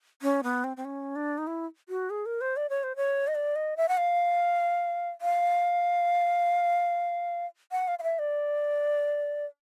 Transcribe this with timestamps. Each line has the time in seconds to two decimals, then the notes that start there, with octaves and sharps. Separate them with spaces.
0.22 C#4
0.43 B3
0.64 C4
0.77 C4
0.85 C#4
1.16 D4
1.38 D#4
1.47 E4
1.89 F#4
2.10 G#4
2.26 A#4
2.41 C5
2.57 D5
2.69 C#5
2.83 C5
2.96 C#5
3.27 D#5
3.35 D5
3.56 D#5
3.77 E5
3.88 F#5
3.97 F5
5.21 F5
7.72 F#5
7.88 F5
7.99 F5
8.03 E5
8.19 D5